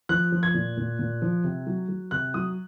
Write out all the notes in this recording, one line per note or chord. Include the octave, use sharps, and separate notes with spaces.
F3 F#6
F3
G#6
A#2
A#2
A#2
F3
C3
F#3
F#3
C3 F#6
F#3 D#6